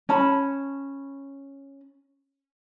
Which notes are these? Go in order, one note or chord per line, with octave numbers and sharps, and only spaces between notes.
C#4 A5 B5